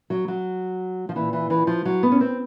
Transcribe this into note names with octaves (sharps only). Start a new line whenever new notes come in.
F#3
F#3
F3
A#2 E3
E3
E3
F3
F#3
B3
C#4
C4